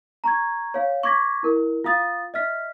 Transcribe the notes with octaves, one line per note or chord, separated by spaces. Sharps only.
A#5 C#6 G#6
C#5 F5
C#6 D6 G#6 A#6 B6
E4 A#4
F4 F5 D#6 A6
D#5 E5 F6 B6